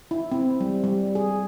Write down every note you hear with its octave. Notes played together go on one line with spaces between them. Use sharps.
E4
C4
G3
G3
G#4